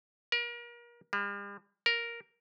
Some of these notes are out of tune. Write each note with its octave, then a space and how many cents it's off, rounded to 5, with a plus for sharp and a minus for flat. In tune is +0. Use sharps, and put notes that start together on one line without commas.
A#4 +35
G3 +45
A#4 +5